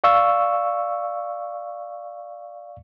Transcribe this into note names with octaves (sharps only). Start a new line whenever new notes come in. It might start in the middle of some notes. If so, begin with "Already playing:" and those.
D5 F5 C#6 E6